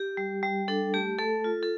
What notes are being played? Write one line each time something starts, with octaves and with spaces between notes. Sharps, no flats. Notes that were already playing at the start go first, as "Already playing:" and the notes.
Already playing: G4
G3
G3
D4 A4
A3 G4
A3 A4
F4
A4